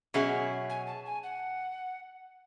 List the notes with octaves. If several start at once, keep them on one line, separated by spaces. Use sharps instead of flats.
B2 F#3 C#4 G#4 E5
G#5
A5
G#5
F#5